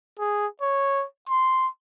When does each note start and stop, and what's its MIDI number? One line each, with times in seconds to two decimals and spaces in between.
0.19 0.47 68
0.62 1.05 73
1.29 1.68 84